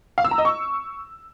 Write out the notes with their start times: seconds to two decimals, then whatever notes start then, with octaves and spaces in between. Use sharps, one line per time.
0.18 F5
0.24 E6
0.31 A#5
0.38 D#5
0.45 C#6